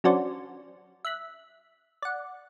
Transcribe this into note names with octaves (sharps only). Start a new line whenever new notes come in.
F#3 C#4 D4 F#4 C5 D5
E5 F#6 B6
D5 F#5